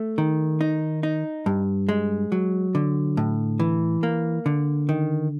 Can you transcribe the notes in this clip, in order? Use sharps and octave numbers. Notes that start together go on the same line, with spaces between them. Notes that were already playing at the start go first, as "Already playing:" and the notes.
Already playing: A3
D#3
D#4
D#4
G2
G#3
F#3
D3
A2
E3
A#3
D3
D#3